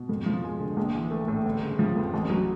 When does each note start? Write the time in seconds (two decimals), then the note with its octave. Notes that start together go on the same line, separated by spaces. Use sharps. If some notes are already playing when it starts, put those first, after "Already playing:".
Already playing: B2
0.09 F2
0.26 F3
0.44 G#3
0.60 D3
0.77 A#1
0.95 E3
1.11 A3
1.28 A2
1.45 G1
1.63 C#3
1.79 F3
1.96 F2
2.14 A1
2.30 F#3